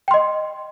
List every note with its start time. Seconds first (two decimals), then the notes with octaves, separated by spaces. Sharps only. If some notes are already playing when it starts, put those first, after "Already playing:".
0.08 G5
0.11 C6
0.14 D#5